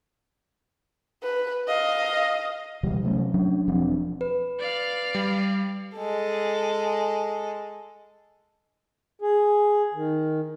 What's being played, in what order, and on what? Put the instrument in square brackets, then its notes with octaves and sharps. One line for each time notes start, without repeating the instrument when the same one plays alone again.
[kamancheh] B4
D#5 F5
[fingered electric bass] C#2 B2 E3 G3
C3 F#3 A3 C#4
F#3 C#4 D4
E1 F3 C4 D4
[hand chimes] B4
[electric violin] D5 F5
[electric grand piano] G3
[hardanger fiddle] G#3 A4
[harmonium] G#4
D#3